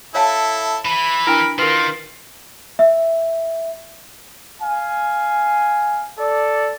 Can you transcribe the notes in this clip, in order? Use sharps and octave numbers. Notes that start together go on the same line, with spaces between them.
E4 A4 C#5 F5 A5
E3 B5
D4 E4 A#4
D#3 F4 A#4 B4
E5
F5 G#5
A4 D5